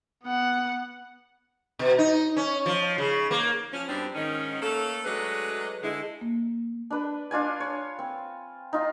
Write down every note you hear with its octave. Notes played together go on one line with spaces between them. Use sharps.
B3 F#5
B2
D#4
C#4
F3
C#3
A#3
F3 C#4
F#2 G3 B3 C4 D4
G#2 D#3 C#4
A3 A#3 C#4 A4
F#3 G#3 A3 D4 B4 D#5
D3 G#3 E4
A#3
D4 B4
D4 F4 D5 G#5
C#5
C4
D#4 F4